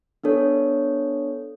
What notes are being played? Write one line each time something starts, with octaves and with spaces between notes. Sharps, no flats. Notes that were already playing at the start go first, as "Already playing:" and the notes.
B3 D4 A4 C#5